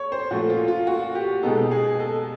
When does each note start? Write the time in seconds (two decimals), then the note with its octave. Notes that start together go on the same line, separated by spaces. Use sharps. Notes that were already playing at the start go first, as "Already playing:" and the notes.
Already playing: C#5
0.12 C5
0.31 A#2 F3 A3 F#4
0.50 F4
0.68 F4
0.87 F#4
1.15 G4
1.43 B2 G#3 B3 D#4 A4
1.71 G#4
2.00 A4